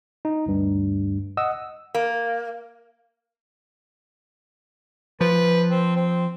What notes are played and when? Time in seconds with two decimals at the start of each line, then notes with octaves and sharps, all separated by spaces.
0.25 D#4
0.46 D2 G2
1.37 D#5 F#5 D#6 E6
1.94 A#3
5.21 F3 B4
5.71 C4
5.96 C4